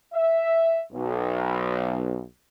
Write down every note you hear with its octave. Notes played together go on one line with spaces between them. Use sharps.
E5
B1